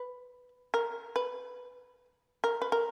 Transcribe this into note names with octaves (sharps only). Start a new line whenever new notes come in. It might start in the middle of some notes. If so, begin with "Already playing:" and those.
Already playing: B4
A#4
B4
A#4
B4
A#4